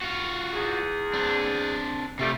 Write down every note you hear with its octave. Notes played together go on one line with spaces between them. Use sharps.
F4 F#4
E2 G#4
C4 D4
C3 G3 A3 F4